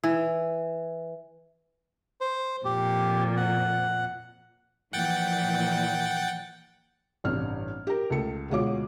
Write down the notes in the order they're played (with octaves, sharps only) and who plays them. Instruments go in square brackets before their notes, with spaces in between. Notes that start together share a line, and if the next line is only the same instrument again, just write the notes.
[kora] E3
[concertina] C5
[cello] F2 A#2 [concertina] G4
[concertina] F#5
[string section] A#2 E3 F3 [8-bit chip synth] F#5 G5 A6
[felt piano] A1 G2 C3 F6
G4 A#4
C#2 A3 A4 C#7
D2 B2 G#3 F4 C#5 D6